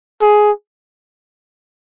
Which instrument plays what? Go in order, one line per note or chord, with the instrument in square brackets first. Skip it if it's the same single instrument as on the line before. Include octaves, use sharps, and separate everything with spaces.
[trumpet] G#4